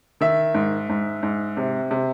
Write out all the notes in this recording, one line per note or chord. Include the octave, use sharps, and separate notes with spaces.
D#3 E5
G#2
G#2
G#2
C3
C3